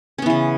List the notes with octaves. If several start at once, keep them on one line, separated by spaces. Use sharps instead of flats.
C#3 E3 B3 C#4